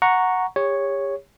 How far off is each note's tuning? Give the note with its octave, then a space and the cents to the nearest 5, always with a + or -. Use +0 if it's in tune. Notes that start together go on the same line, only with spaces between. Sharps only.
F#5 -5 A#5 +0 C#6 +0
G4 +40 C#5 +0